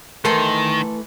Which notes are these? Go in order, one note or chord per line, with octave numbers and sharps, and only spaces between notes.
D#3 E3 A3 A4 A#4 C6